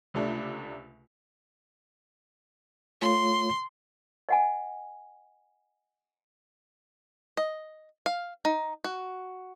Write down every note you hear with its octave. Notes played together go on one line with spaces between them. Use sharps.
C#2 C3 A3 D4
A3 F4 C#5 C6
D#5 F#5 G#5
D#5
F5
D#4
F#4